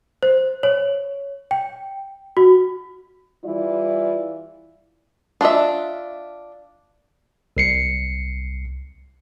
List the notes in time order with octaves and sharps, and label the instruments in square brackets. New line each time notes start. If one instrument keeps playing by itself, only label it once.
[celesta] C5
C#5
G5
F#4
[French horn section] E3 G3 E4 F4 D5
[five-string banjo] D4 F4 D#5 E5
[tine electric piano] C2 C7 C#7